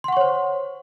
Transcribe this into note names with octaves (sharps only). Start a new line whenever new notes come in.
C5 C#5 F#5 C6 C#6